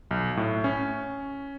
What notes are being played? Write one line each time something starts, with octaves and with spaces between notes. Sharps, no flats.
B1
A2
C#4